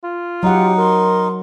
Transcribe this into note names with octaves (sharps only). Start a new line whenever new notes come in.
F4
F#3 D#4 G4 F#5
A#4 C6